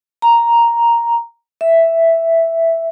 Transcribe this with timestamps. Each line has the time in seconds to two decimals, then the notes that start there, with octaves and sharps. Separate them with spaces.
0.22 A#5
1.61 E5